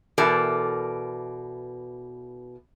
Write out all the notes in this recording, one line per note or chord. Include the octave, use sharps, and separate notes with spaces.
B2 E3 A4 A#4 D5